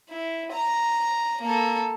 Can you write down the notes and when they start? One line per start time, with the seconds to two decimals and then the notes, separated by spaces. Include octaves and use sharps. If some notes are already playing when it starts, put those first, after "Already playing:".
0.10 E4
0.53 A#5
1.42 A#3 A4